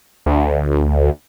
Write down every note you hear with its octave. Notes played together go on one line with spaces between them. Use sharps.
D2